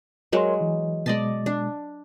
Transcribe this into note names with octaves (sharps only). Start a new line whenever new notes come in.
F#3 G#3 A#4 C#5 C6
E3
B2 G#3 D5 D#5 A5
D4